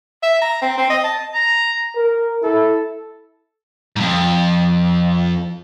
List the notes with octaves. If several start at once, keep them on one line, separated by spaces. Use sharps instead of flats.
E5
A#5
C4
C4
D#5
A5
A#5
A#4
E4 A4
F2 G#2